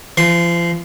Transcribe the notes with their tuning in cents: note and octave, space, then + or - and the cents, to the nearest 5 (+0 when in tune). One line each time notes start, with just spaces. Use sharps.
F3 -35 C6 +0